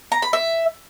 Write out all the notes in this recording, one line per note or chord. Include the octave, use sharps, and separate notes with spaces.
A#5
B5
E5